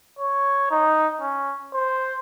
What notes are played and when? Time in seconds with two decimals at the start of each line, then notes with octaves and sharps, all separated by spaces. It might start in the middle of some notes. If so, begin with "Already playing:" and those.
0.19 C#5
0.71 D#4
1.21 C#4
1.74 C5